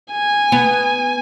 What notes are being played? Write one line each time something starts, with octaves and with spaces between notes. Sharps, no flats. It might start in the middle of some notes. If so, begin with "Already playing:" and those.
G#5
B3